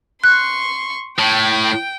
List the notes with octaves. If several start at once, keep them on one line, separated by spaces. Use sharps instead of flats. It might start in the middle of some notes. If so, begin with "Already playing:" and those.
C6 C#6 F#6
A2 G5